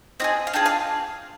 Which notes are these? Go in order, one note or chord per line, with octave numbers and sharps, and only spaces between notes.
C4 F4 G#4 D#5
F5
D4 F4 G#4 G5
F5